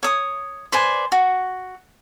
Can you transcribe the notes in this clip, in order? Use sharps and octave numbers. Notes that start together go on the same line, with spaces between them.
C#5 D#6
B4 C5 D5 G#5
F#4